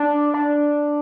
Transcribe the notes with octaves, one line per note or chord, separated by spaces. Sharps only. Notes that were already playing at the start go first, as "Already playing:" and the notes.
Already playing: D4
D4